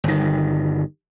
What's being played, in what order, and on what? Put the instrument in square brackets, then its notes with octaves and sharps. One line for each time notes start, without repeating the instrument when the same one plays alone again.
[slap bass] G1 D#3